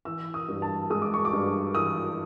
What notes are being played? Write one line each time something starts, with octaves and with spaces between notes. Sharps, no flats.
E3 E6
D#6
G2
A5
G#3 D#6
D6
C#6
D6
G2
E3 D#6